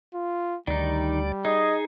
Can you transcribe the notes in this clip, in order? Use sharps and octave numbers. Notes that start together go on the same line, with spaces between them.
F4
D2 D#3 G3 D#4 D5
D#4 G#4 D#5